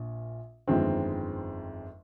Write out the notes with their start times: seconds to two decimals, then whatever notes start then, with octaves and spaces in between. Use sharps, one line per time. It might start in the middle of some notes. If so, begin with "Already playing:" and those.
Already playing: A#1 A#2
0.67 G1 F2 D#3 G#3 C4